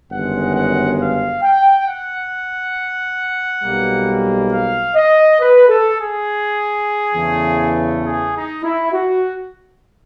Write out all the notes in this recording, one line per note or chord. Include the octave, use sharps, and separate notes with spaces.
G1 F#2 D#3 G#3 F#5
F#5
F5
G5
F#5
B1 B2 G3 A#3
F5
D#5
B4
A4
G#4
E2 C#3 E3 A3
G#4
D#4
E4
F#4